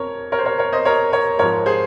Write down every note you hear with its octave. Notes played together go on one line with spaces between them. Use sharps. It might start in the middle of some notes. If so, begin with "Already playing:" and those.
Already playing: F2 A#4 C#5
A#4 C#5
C5
A#4 C#5
A#4 C#5
C5 D#5
A#4 C#5
A#4 C#5
G#2 F3 A#4 C#5
G#4 C5